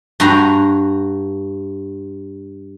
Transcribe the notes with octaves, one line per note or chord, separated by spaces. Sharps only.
G2 F#4 A#5